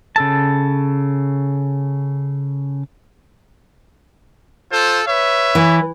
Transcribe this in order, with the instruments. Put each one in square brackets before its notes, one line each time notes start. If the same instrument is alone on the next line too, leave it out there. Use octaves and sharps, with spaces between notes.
[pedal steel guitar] C#3 A4 A5
[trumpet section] F4 A4 C5
B4 C#5 E5
[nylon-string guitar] E3